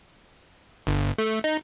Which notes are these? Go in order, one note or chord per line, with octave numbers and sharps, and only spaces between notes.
G1
A3
D#4